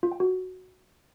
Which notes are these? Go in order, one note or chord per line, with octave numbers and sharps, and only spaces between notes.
F4
G5
F#4